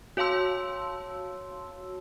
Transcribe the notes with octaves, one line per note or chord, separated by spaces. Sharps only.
F#4 C#5 F5 A5 C6 E6